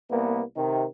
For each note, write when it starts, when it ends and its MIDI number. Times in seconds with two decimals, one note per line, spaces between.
0.10 0.42 36
0.10 0.42 58
0.10 0.42 59
0.55 0.84 48
0.55 0.84 51